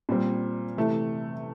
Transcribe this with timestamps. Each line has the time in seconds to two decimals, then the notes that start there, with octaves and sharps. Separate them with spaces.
0.09 A#2 G3 C4
0.77 C3 E3 A3